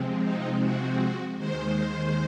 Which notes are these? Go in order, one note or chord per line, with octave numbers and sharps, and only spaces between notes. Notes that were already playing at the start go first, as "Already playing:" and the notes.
Already playing: C3 F3 G#3 C4
D#4
F#4
D#2 D#3 G#3 C5